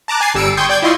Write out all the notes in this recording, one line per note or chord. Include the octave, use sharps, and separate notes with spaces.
A5 A#5 D6 F#6
G#5 A6 C7
G1 G3 E6 C#7 D7
G5 C6 C#6 D#6 G6 G#6
D5 G5 G6 G#6
E4 F4 D#5 C6 C#6